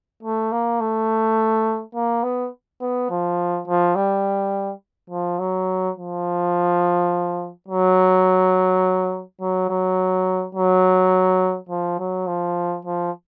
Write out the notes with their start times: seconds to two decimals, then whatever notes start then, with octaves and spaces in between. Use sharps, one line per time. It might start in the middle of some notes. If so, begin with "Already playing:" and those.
0.23 A3
0.52 A#3
0.80 A3
1.95 A#3
2.23 B3
2.81 B3
3.11 F3
3.67 F3
3.95 G3
5.10 F3
5.39 F#3
5.96 F3
7.68 F#3
9.41 F#3
9.69 F#3
10.55 F#3
11.69 F3
11.99 F#3
12.27 F3
12.85 F3